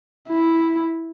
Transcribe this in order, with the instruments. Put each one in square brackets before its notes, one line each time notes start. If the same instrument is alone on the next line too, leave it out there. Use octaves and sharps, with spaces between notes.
[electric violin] E4